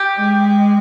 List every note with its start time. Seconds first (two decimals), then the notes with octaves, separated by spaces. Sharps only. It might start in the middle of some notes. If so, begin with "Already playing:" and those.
Already playing: G4
0.17 G#3